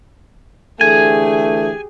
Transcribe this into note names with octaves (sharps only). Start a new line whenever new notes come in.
D3 E3 A3 G4 G#4 G#5